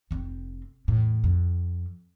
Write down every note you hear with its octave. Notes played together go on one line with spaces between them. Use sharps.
F1 C4
E2 A2
F2